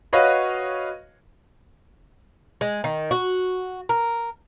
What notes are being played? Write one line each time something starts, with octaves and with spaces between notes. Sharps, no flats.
F#4 B4 C#5 D#5 F5
G#3
D#3
F#4
A#4